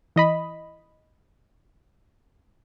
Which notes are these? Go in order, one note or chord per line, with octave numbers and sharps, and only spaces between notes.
E3 D#5 B5